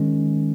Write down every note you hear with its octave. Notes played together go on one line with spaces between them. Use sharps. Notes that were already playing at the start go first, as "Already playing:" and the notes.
Already playing: D#3 G#3 C#4